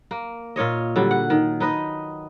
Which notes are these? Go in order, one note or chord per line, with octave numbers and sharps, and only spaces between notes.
A#3
A#2 F4 C#5 D#5
D3 F#3 G3
F#5
D#3
D#4 B4 D#5